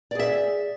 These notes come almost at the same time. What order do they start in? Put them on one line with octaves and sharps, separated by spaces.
D5 G#4 E5